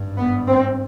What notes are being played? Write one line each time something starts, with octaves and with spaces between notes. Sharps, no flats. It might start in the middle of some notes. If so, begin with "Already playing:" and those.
Already playing: G#1 G2
B3
C4